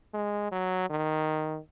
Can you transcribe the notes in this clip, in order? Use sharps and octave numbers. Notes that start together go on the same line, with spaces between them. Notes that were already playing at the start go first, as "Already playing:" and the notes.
G#3
F#3
D#3